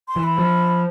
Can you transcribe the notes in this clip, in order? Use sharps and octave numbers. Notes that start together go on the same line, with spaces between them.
C6
E3
B5
F3